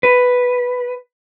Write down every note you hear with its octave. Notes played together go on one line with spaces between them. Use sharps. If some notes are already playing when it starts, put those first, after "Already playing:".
B4